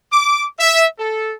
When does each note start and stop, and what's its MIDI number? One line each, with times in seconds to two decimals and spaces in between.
0.12 0.45 86
0.59 0.86 76
0.99 1.33 69